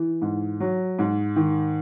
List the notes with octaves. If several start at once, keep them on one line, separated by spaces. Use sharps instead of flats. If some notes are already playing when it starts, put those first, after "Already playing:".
Already playing: E3
G#2
F#3
G#2
D#3